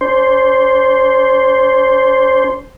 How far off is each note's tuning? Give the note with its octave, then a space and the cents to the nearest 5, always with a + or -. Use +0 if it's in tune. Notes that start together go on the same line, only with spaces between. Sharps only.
C#4 +45 C5 +0